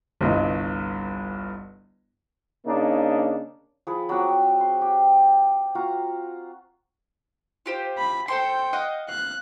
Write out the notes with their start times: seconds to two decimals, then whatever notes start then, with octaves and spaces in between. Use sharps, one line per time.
0.21 G1 C2 G2 D#5
2.66 C#3 A#3 D4 D#4
3.87 F3 G#4 B4
4.09 F#3 C4 F#5 D6
4.60 C6
4.81 G4
5.75 F4 F#4 A#5 C6
7.66 F4 G4 C5
7.98 B5
8.28 A4 C5 G5 C6
8.73 D#5 F5 F#5
9.09 F5 F#6